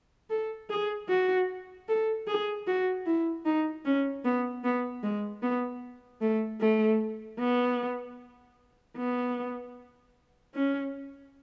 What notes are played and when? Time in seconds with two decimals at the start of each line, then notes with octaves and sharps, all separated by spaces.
0.30 A4
0.70 G#4
1.09 F#4
1.88 A4
2.28 G#4
2.67 F#4
3.06 E4
3.46 D#4
3.85 C#4
4.25 B3
4.64 B3
5.03 G#3
5.43 B3
6.22 A3
6.61 A3
7.39 B3
8.98 B3
10.55 C#4